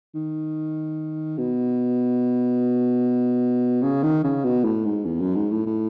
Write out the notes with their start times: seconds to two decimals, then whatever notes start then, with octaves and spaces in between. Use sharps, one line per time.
0.15 D#3
1.38 B2
3.83 C#3
4.03 D#3
4.24 C#3
4.44 B2
4.65 A2
4.85 G#2
5.05 E2
5.21 F#2
5.36 G#2
5.51 A2
5.66 A2